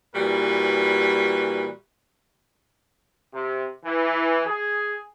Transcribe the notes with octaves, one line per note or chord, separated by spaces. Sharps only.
A#2 E3 G3 F#4 B4
C3
E3
G#4